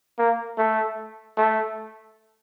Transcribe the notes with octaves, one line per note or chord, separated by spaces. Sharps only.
A#3
A3
A3